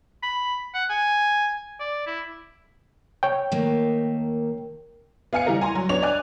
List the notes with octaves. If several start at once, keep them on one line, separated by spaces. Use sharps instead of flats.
B5
F#5
G#5
D5
E4
C#5 G5
D#3 A3 A#3
B3 F5 G#5 F6 C#7
E3 G3 A#4
G#5 A#5 C6
F#3
B3 D4 C#5 F7
D5 G#5 D6 F#6